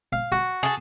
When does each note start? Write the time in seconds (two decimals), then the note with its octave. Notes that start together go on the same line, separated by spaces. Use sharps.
0.13 F5
0.32 F#4
0.63 G#4 A4